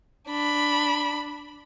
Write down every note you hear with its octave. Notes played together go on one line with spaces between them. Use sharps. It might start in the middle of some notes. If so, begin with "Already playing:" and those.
D4 B5